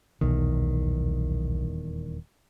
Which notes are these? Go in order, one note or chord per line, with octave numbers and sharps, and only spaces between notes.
D#1 B1 E2 D#3